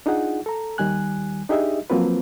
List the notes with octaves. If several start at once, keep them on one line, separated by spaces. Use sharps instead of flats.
D4 D#4 F4 G#4 F#5
A4 A#5
D#2 D#3 G3 G#5 F#6
D4 D#4 G4 G#4 D#5 E5
F3 F#3 A#3 C4 F4 B4